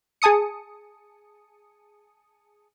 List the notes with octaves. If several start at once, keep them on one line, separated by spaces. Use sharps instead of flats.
G#4 G#5 A5 D#6 C#7